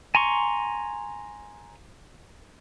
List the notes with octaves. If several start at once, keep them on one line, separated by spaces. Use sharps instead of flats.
G#5 A#5 C6 C#6